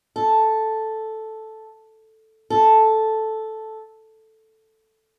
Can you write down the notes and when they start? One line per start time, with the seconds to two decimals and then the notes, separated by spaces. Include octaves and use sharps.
0.16 A4
2.50 A4